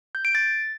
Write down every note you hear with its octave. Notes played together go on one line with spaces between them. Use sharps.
G6
D7
A6